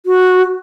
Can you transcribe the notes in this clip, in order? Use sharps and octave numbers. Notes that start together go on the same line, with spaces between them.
F#4